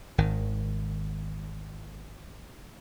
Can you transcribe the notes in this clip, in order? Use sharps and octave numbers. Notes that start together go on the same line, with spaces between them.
G#1 D#3